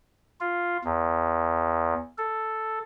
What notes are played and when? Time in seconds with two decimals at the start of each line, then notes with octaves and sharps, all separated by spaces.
0.40 F4
0.85 E2
2.18 A4